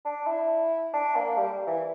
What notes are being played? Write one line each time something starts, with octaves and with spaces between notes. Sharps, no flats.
D4
E4
D4
A#3
G3
E3